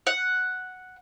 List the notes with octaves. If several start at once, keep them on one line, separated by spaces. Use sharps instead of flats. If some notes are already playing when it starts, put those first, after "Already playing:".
F#5